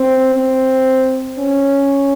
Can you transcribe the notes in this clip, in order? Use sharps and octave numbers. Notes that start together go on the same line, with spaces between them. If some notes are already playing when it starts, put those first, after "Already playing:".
Already playing: C4
C4
C#4